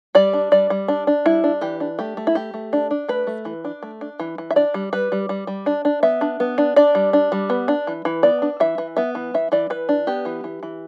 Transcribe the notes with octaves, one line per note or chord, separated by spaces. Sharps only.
G3 D5
D4
G3 D5
G3
D4
D4
G3 E4
D4
E3 G4
D4
A3 G4
A3
E4
A3 G4
A3
D4
D4
A3 B4
A3
E3
D4
A3
D4
E3
E3
E5
D4 D5
G3
G3 B4
G3
G3
G3
D4
D4
B3 E5
D4
B3
D4
D4 D5
G3
D4
G3
B3
D4
E3
E3
B3 D5
D4
E3 E5
E3
B3 E5
E3
E3 E5
E3 D5
E3 B4
D4
B3 G4
E3
E3
E3